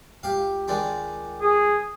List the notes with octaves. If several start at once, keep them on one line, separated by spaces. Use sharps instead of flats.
C#2 G4 F5
D#3 G#3 D4
G#4